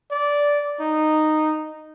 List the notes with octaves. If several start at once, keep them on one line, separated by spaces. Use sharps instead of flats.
D5
D#4